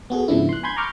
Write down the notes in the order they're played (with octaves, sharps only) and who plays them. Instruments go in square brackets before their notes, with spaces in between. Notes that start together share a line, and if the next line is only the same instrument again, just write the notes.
[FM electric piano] B3 F#4 G#4 A4
G#2 C#3 F3 B3 D4 E4
C6 F#6
G#5 B5 C6 G6 G#6
A#5 B5 C#6 D6 F6 G6